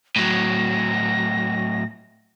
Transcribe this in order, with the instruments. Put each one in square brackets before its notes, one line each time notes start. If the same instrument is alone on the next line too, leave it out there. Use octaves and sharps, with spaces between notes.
[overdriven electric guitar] A2 F#3 [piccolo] A#6